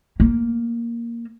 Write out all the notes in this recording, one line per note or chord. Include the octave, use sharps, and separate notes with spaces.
A#3